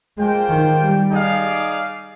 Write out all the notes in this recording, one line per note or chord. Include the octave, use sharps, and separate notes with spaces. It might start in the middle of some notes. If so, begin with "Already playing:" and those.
G#3 A#3 F4 C5 G5
D#3
G3
D#4 G#4 D5 F5